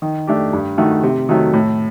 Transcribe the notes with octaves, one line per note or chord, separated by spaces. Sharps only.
D#3
A3 D4 G4
G2
D#3 A3 D#4 F#4
C3
D#3 F#3 A3
A2